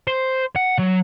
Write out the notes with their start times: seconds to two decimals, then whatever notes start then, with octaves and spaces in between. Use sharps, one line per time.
0.08 C5
0.56 F#5
0.79 F#3